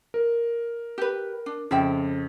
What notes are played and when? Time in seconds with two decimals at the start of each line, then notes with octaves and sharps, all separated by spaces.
0.14 A#4
0.98 G4 B4
1.46 D4
1.71 F2 C#3 F4 E5 G5